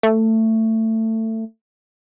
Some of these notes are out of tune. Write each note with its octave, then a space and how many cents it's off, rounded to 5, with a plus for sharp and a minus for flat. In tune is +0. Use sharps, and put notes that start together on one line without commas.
A3 +20